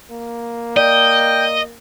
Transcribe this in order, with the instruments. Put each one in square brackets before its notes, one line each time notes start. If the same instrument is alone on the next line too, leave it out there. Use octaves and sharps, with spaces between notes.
[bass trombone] A#3
[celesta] D5 [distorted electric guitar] D#5 [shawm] G5